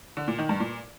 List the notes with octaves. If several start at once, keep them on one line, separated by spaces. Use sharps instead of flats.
D3
A#2
D#3
G2
A#2